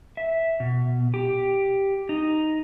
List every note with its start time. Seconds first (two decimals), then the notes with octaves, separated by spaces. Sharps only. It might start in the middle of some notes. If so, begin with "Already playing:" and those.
0.17 E5
0.60 B2
1.14 G4
2.09 D#4